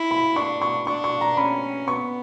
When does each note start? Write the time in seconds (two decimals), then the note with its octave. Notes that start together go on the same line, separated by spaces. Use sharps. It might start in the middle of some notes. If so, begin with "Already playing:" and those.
Already playing: E4
0.11 B5
0.36 D4 C#6
0.62 C#6
0.87 D4 C#6
1.04 C#6
1.21 A#5
1.37 C#4 B5
1.87 B3 C#6